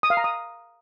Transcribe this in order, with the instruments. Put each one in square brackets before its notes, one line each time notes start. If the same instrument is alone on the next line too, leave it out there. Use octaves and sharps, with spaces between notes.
[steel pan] D#6
F5
A#5
D#6